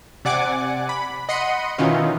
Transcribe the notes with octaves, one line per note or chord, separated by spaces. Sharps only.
C3 D5 F#5 G#5 D6
B5
D#5 F#5 B5 C6 C#7 D#7
B2 D#3 E3 C#4 D#4 F4